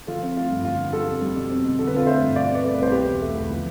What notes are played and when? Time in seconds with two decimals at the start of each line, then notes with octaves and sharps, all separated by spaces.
0.07 F3 F4 A4
0.22 C4
0.36 A3 F4
0.51 G2
0.65 D3 F4
0.79 B3
0.93 G3 F4 A4
1.08 F2
1.21 G3
1.36 B2
1.51 C4
1.65 B2
1.79 D3 A4
1.87 B4
1.93 C4 F4 A4
2.07 A3 C5 E5
2.21 G2
2.35 B2 D5 F5
2.50 C4 B4 D5
2.64 A3
2.75 B4
2.79 C2 C5
2.91 B2 G4 B4
3.08 E2
3.21 A3
3.36 E2
3.50 F3